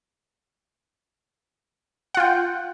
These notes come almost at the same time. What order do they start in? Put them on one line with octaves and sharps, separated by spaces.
F#5 F4 G5